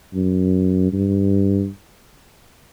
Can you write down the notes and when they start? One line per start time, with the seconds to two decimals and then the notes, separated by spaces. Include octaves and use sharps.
0.14 F#2
0.93 G2